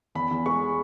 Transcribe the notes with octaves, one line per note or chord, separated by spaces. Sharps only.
E2 B5
E2
G#3 C#6